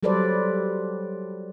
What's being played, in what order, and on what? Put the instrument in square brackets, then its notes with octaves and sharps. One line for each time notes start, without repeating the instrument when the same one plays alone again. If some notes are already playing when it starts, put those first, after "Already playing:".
[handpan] F#3 G3 A4 B4 C5 D5